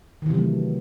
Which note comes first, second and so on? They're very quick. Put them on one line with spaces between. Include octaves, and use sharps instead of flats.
D#3 E3 C3 F#3 A3